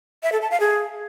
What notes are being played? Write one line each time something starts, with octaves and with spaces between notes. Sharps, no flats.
E5
A4
A5
F5
G#4